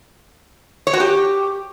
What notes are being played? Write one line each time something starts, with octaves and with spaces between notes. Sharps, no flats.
C#5
F#4
G4